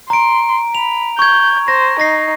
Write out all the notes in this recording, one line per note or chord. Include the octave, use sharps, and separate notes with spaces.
A#5 C6 D7
B5 F7
C#6 G6 G#6
C5 A#6
D#4 A#6 C7